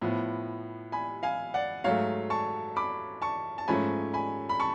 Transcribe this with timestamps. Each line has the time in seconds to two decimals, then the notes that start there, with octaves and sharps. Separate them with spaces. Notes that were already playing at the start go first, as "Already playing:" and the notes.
0.02 A2 F3 B3
0.92 G#5 B5
1.23 F5 G#5
1.54 D5 F#5
1.84 G#2 F#3 A3 C#5 F5
2.30 A5 C#6
2.76 B5 D6
3.22 A5 C#6
3.58 A5
3.68 G#2 F3 A3 C#4 G#5 B5
4.13 G#5 B5
4.49 B5
4.60 A5 C#6